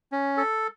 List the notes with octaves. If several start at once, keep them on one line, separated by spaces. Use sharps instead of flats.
C#4
A4